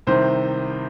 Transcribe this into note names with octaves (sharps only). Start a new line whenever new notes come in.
C2 C3 D#3 C5